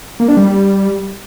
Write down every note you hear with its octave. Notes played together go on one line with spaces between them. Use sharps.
A#3
D4
G3